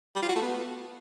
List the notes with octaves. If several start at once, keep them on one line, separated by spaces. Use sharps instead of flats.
G3
F4
F#4
A3
B3